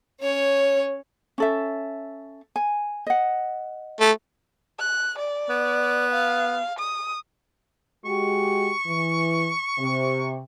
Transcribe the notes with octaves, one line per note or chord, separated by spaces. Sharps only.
C#4 C#5
C#4 A4 E5
G#5
D#5 F#5
A3
F#6
D5
B3
F5
D#6
G#3 F#4 G4 C#6
E3
C3